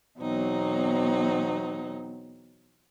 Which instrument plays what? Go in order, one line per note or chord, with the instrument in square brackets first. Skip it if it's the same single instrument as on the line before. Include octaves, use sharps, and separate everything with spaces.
[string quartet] E2 B2 F#3 C4 D#4